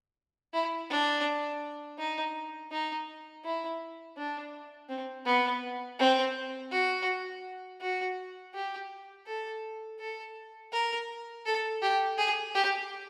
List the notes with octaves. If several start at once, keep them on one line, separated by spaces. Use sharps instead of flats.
E4
D4
D#4
D#4
E4
D4
C4
B3
C4
F#4
F#4
G4
A4
A4
A#4
A4
G4
G#4
G4